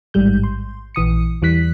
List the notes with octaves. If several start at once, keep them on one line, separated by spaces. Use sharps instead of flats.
A1 G#2 G3 G6
C6
A#1 E3 D#6 C#7
E2 E3 G3 F#6 B6